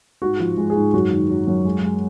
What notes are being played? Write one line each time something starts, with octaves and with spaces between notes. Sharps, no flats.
G#2 F#4
F3
G#3
G#4
G#2
F#2 F#4
D#3
F#3
F#2
G#3
G#3